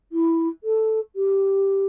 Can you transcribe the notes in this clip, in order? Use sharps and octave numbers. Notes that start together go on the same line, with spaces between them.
E4
A4
G4